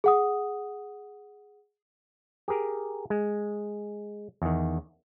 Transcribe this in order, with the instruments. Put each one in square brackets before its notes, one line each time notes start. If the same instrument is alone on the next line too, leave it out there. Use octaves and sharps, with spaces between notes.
[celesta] G#4 F#5 D#6
[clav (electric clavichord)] G4 G#4 A#4
G#3
E2 D#3